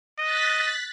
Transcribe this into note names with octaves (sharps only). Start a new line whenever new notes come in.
D#5 F#6 A6 B6